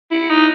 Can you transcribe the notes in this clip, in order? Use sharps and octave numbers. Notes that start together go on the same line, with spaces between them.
E4
D#4